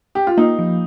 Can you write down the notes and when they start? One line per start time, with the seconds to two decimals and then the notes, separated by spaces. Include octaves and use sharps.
0.15 G4
0.27 F4
0.38 A#3 D#4
0.59 F3